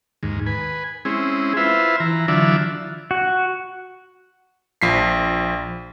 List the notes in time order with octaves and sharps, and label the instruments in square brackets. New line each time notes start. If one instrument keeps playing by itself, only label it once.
[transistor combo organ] D#2 G#2
B4 G#5
G#3 C4 C#4 E4 G#4
E4 F4 B4 C5 E5
E3 A#5
D3 E3 F#3 F4 D5 E5
[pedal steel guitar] F#4
[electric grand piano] A#1 F3 B6 C7